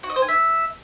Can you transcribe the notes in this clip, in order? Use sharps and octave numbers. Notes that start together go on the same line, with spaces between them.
F#4
D#5
C5
G#5
E5